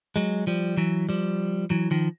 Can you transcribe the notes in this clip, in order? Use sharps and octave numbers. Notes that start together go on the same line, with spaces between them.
F#3 G#3
F3 G3
E3 F#3
F3 G3
E3 F#3
D#3 F3